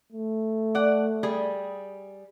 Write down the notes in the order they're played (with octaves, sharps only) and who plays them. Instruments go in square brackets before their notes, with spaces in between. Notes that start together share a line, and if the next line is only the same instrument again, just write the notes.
[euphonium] A3
[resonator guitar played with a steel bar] D5 F#5
G3 G#4